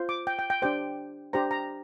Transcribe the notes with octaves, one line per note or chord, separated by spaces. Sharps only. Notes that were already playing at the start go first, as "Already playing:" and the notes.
Already playing: F4 C5
D6
G5
G5
G5
D4 G4 C5 G5
D4 G4 C5 A#5
A#5